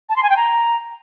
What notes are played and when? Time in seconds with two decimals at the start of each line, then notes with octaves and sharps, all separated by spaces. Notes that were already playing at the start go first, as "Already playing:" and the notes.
0.09 A5
0.16 C6
0.23 G#5
0.30 G5
0.37 A#5